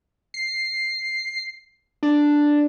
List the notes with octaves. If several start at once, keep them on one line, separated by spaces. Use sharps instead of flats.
C7
D4